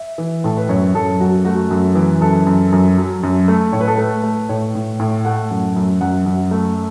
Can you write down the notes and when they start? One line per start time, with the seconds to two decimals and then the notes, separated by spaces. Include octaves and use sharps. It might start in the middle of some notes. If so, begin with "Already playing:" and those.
Already playing: E5
0.18 E3
0.44 A2 A4
0.57 B4
0.69 F#2 C#5
0.94 F#2 A4
1.20 F#2 F#4
1.45 A3 F#4
1.71 F#2
1.95 E3
2.21 F#2 A4
2.46 F#2
2.72 F#2
2.98 F#3
3.23 F#2
3.48 A3
3.73 A2 C#5
3.81 B4
3.88 A4
3.96 A3 B4
4.23 A3
4.49 A2 C#5
4.75 A2
5.00 A2
5.25 A3 F#5
5.51 F#2
5.76 F#2
6.01 F#2 F#5
6.26 F#2
6.51 A3